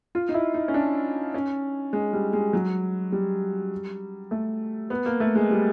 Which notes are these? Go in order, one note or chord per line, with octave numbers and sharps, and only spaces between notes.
F4
D#4
E4
D#4
C#4
D4
C#4
G#3
G3
G#3
F#3
G3
A3
B3
A#3
A3
G#3
G3